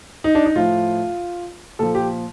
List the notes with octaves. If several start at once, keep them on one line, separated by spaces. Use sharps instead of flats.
D#4
D4
D#4
A2 F3 F4
A#2 F3 A4
G4